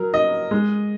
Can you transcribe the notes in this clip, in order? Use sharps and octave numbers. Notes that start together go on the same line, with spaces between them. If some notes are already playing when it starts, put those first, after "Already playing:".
Already playing: F#3 A#4
D#5
G#3